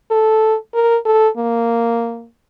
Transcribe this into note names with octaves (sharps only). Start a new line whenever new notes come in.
A4
A#4
A4
A#3